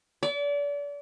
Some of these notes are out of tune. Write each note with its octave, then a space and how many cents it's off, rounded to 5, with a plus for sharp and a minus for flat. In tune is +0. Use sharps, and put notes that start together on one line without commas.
D5 -35